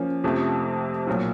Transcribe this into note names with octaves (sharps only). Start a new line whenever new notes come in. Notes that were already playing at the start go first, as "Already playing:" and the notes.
Already playing: F3 A#3 C#4
F2 C3 F3 A3
B1 A#2 F#3